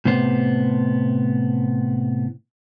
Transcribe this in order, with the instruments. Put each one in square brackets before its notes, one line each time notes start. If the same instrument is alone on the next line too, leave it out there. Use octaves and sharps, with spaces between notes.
[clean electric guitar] A2 C3 B3 C5